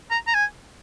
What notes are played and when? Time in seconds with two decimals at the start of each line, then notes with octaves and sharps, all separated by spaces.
0.11 A#5
0.27 A#5
0.34 G#5